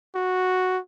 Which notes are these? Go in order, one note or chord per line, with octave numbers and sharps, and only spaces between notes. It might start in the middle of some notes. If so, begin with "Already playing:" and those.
F#4